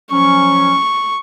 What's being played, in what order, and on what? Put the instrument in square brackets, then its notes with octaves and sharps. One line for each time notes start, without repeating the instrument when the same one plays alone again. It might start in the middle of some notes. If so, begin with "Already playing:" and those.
[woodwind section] F3 F#3 C#4 [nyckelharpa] C#6